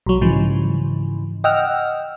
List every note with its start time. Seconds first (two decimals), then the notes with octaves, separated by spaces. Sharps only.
0.06 B1 F#3
0.21 G#2 C#3 E3 F3
1.44 D#5 F#5 G5 E6 F6